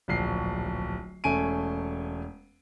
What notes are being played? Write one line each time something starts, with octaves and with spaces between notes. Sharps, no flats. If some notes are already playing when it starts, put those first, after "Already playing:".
D1 A#1 C7
E1 A3 C#4 G#5 D7 D#7